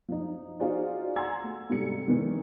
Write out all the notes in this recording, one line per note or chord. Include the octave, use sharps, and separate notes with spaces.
F3 D#4
D#4 F4 F#4 G#4 C5 D5
F#5 G#5 A#5 C6 E6 G#6
A3
G#2 C3 G3 G4 A4 C#7
D#3 E3 G#3